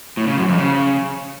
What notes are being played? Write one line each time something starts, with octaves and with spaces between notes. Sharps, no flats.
A2
C#3
F#2
F2
C#3